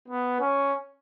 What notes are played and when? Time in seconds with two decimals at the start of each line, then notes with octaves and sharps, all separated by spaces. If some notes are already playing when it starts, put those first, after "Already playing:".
0.09 B3
0.41 C#4